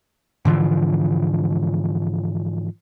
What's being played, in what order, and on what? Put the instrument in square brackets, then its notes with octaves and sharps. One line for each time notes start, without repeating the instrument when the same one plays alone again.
[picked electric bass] G#2 D3 E3 F3